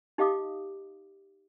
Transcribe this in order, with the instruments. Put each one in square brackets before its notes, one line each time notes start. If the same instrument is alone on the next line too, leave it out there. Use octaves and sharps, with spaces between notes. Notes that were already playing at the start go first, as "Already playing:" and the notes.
[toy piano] D#4 G4 D#5 F5 D6 D#6